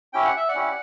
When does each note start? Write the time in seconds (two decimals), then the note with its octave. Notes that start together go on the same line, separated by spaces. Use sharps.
0.13 C#4 E4 G4 G5
0.24 F#5
0.37 E5
0.49 D5 F#5
0.55 C#4 E4 G4